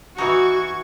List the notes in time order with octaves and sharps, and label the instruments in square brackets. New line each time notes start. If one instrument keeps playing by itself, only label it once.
[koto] E3 D#4 [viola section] F#4 [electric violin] C#6 G#6